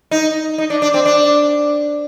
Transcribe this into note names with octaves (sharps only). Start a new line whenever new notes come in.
D#4
D#4
D4
D4
C4
D4